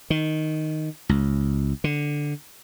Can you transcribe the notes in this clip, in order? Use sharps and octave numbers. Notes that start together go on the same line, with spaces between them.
D#3
C#2
D3